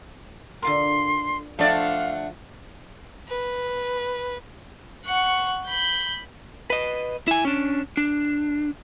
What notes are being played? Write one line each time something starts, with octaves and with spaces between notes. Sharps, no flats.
D3 F4 A#4 C6
F3 A3 D4 F4 D5 F5 F#5
B4
F#5 C#6
B5 G6
B4 D#5
E4 G#5
C#4 D4
D4